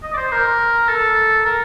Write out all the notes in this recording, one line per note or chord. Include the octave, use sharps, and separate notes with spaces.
D#5
D5
C5
A#4
A4
A#4